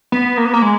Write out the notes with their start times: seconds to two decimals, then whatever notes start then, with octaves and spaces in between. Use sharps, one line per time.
0.12 B3
0.37 A#3
0.45 B3
0.54 A#3
0.62 G#3